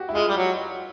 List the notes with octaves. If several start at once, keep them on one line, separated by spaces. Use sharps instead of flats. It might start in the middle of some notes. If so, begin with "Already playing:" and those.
Already playing: F#4 G4
E4
G#3 F4
G3
F#3